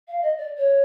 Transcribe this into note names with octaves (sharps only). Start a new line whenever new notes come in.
F5
D#5
D5
C#5